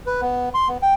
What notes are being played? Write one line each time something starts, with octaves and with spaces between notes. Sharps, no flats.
B4
B3
C6
B3
G5